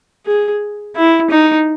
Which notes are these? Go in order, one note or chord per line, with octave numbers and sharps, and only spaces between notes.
G#4
E4
D#4